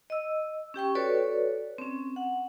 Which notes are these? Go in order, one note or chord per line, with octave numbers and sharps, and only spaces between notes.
D#5 E6
C#4 G4 G5 C#6
F#4 A4 B4 C#5 D5
C4 C#4
F#5